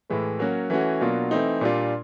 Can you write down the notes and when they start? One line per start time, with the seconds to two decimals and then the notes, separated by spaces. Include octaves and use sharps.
0.10 A2 E3 G#3
0.39 F#3 A#3 C#4 F#4
0.70 E3 A3 C#4 F#4
1.01 B2 F#3 A#3 D4 F4
1.31 E3 A3 C4 D#4
1.61 A#2 G3 A#3 D4 F4